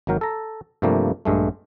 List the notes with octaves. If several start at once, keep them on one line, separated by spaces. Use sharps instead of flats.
G#1 D#3 F#3 A#4 G5
A4 A#5
G2 C3 F3 G3 A3 A#3
A#1 G2 G#3 A3